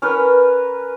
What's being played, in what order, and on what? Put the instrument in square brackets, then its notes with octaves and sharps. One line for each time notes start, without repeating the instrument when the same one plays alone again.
[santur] C#4 A#4 B4